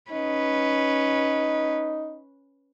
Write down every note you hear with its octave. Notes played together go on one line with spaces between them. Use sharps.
C#4 D#4 B4